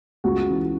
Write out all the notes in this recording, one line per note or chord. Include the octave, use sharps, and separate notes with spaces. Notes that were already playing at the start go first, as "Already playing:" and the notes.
C#2 F#4
C#3 E3